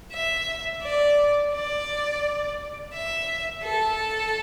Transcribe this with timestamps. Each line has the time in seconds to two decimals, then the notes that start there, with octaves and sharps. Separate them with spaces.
0.12 E5
0.83 D5
1.53 D5
2.94 E5
3.64 A4